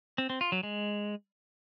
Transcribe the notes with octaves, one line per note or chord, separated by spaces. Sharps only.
C4
C4
F4
F#3
G#3